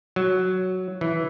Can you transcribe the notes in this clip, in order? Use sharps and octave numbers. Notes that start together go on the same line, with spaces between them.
F#3
E3